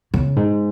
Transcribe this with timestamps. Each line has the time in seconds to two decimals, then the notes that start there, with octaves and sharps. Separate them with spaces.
0.14 C#3
0.36 G#2